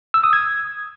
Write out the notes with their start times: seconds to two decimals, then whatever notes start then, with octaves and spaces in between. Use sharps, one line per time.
0.14 E6
0.24 D#6
0.33 G#6